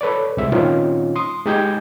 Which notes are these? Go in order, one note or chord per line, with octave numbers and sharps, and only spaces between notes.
A4 B4 C#5 D5
C2 C3 G#3 E5
A#2 D#3 C4 C#4 D#4 F4
C6 D#6
G#3 D#4 G4 G#5 G6 G#6